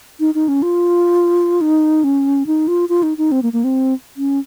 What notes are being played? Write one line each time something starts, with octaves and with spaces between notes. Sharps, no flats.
D#4
D#4
C#4
F4
D#4
C#4
D#4
F4
F4
D#4
D#4
C4
A#3
A#3
C4
C#4